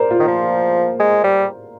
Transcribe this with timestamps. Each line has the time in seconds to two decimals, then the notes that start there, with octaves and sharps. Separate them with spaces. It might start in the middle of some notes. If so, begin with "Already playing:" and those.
Already playing: A#4 C5 D5
0.11 F4
0.20 D#3
0.28 F3
1.00 G#3
1.24 G3